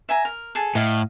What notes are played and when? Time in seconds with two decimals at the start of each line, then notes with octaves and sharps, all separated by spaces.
0.09 E5 G#5 A#5
0.25 A#4
0.55 G#4 A4 A5
0.75 A2 D#5 F5